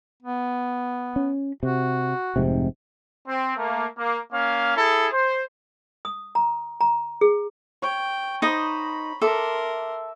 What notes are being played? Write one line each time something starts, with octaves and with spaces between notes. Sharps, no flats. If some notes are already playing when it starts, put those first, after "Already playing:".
B3
C#4
C3 F#4
F1 G#2 C3
C4
A3 A#3
A#3
A#3 C#4 F5
E4 G#4 A4
C5
D#6
A#5
A#5
G#4
C#5 G5
D#4 C5 A#5 B5 D#6
A4 A#4 E5 C6 D6